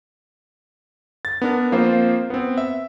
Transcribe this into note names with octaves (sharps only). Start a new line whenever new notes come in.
A6
B3 D4 A#4
F3 A#3 C4 F4 C5
B3 C4
E5